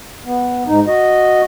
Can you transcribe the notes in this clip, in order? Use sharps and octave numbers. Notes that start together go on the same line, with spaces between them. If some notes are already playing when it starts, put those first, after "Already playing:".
B3
G#2 D#4
F#4 D#5